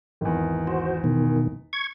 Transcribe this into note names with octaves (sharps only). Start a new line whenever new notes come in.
G#1 E2
F#4 C5
B2 D#3
C#6 G#6